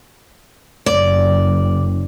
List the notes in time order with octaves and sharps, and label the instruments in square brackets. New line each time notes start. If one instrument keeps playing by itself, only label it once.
[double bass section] F#1 [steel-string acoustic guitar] D5